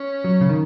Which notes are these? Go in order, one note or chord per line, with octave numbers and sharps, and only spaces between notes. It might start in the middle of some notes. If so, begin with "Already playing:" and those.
Already playing: C#4
F#3
C#3
D#3